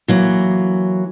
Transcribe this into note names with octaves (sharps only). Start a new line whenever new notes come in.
E3 F#3 A#3